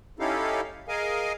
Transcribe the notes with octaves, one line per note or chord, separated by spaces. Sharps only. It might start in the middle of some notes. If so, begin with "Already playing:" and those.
C#4 D#4 E4 G4 A4 F5
G#4 A#4 D#5 F5 G#5